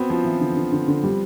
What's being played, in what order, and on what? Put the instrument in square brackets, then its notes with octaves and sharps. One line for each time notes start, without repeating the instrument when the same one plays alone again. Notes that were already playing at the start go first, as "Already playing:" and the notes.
Already playing: [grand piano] B3 C4 [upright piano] F#4
[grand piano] F3 [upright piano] C#4
[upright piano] E3
D3
D3
D3
D3
G3